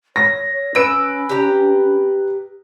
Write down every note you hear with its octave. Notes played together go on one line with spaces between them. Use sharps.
C#5 A#6
C#4 B4 E6 D7
G4 A#5